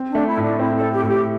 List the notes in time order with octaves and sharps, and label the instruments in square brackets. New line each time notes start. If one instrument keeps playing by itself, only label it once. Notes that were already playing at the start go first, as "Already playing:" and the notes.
Already playing: [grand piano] C4
[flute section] D4
[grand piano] A3
[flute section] E4
[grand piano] A2 [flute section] D4
[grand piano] C4 [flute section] E4
[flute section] A4
[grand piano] C4
[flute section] G4
[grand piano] A2 [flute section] E4
[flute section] G4